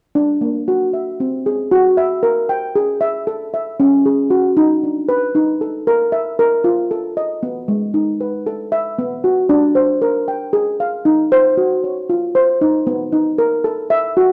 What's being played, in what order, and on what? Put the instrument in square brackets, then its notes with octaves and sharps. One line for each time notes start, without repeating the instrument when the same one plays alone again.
[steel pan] D4
A#3
F#4
E5
C4
G#4
F#4
E5
A#4
G5
G#4
E5
A4
E5
C#4
G#4
F#4
D#4
D4
B4
D#4
A4
A#4
E5
A#4
F4
A4
D#5
B3
G#3
D#4
B4
A4
E5
B3
F#4
D4
C5
A#4
G5
G#4
F5
D#4
C5
F#4
C#5
F4
C5
D#4
B3
D#4
A#4
A4
E5
F#4